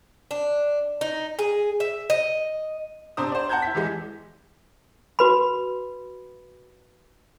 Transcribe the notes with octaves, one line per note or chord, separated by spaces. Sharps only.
D4
D#4
G#4
E5
D#5
C3 D4 C5 A#5 D#6
C5 D5
F#5 A5 A#5 G6 G#6
E4 B6
E2 E3 G#3
F#4 B4 B5